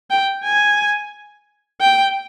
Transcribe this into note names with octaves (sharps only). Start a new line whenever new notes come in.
G5
G#5
G5